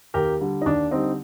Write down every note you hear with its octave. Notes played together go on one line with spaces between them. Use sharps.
D#2 G4 A#4
D3 G3
D#4
D#2 D4
D3 G3 C4 D#4